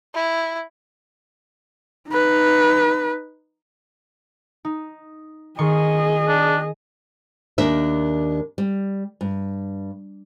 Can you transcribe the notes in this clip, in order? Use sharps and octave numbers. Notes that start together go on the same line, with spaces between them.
E4
D#4 B4
D#4
D#3 G#4 D#5 C6 C#6
D4
D#2 D4 A#4 E5
G3
G2